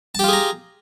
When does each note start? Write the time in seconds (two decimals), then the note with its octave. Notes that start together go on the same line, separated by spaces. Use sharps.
0.15 A5
0.19 G4
0.24 F4
0.28 G#4
0.33 A#5